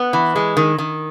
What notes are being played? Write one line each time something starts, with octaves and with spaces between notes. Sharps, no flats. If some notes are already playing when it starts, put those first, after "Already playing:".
Already playing: B3
E3
G#3
D#3
D#3